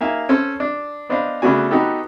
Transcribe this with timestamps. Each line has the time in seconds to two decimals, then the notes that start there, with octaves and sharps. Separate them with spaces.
0.01 A#3 D#4 E5 F5 G#5
0.29 C#4 A4 C5
0.60 D4
1.09 B3 D4 C5 D#5 F5
1.42 C#3 A3 B3 D4 F#4 G#5
1.71 B3 D#4 F#4 G4 A4